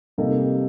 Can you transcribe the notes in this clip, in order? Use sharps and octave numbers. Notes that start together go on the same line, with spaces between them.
C3 G3 A#3 D#4 A4